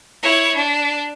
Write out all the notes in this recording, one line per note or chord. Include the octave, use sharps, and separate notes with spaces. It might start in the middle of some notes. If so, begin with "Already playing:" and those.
E4 C#5
D4